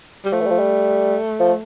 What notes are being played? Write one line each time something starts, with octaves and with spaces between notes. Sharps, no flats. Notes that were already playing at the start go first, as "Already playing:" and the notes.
G3
F3 A3
E3
G3
F3
G3
F3